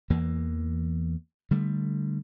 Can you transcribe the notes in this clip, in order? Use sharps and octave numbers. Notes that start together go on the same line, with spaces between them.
E2 E3 A#3
D3 G3 A3